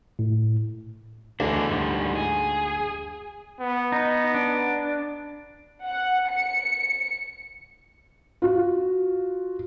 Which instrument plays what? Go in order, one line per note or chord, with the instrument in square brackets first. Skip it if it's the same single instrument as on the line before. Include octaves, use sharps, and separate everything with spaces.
[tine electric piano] A2
[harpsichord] D2 [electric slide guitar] E3 G#3 D4
[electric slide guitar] G#2 F3 G3
G#4
[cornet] B3
[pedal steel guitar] D#4
D4
[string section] F#5
C#7
[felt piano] F4 F#4